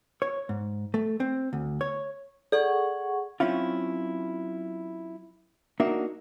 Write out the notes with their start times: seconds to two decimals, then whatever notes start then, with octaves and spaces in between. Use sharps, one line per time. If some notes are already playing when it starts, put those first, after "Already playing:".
0.22 C#5
0.49 G#2
0.94 A3
1.20 C4
1.53 D2
1.81 C#5
2.52 G#4 A4 D5 F#5 C#6
3.40 F#3 C4 C#4 E4 F4
5.80 A#3 D4 D#4 F#4 E5